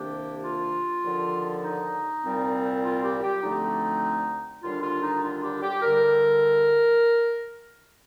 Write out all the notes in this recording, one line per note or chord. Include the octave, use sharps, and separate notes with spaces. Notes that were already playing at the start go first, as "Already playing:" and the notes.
Already playing: C2 C3 D#3 A#3 D4 G4
F4
D#2 D3 F3
D#4
C2 A#2 G3 C4
F4
G4
G4
D2 D3 F3 A3 C4 D#4
D#2 D3 G3 D4 F4
F4
D#4
F4
G4
G4
G2 D3 G3 A#4